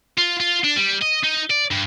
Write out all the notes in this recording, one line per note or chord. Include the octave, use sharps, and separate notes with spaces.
F4
F4
D4
G3
D#5
D#4
D5
G2